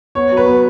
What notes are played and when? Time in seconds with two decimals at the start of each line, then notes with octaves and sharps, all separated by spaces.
0.15 B3 C#5
0.31 F#3
0.37 B4
0.47 B3